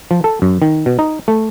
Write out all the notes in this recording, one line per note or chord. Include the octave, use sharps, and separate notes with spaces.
F3
A4
F#2
D#3
B2
D#4
A3